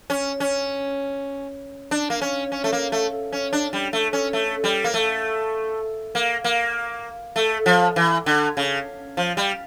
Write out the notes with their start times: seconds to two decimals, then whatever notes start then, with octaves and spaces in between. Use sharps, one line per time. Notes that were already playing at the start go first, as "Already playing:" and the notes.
0.10 C#4
0.40 C#4
1.91 D4
2.10 A#3
2.21 C#4
2.52 C#4
2.64 A3
2.73 A#3
2.92 A3
3.32 C#4
3.53 D4
3.73 G3
3.93 A3
4.13 C#4
4.33 A3
4.64 G3
4.84 A#3
4.94 A3
6.15 A#3
6.44 A#3
7.36 A3
7.66 F3
7.96 E3
8.26 D3
8.57 C#3
9.17 F3
9.37 G3